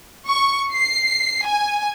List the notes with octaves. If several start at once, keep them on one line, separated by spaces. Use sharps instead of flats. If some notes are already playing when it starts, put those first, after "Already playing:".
C#6
C7
G#5